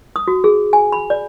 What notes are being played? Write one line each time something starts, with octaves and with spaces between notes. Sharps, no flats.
D#6
F#4
G#4
G#5
B5
D5